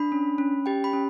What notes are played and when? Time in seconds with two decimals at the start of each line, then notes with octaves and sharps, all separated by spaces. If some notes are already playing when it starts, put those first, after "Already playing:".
Already playing: D4 B5
0.12 C#4
0.38 C#4
0.66 G4 G5
0.84 B5
0.93 C#4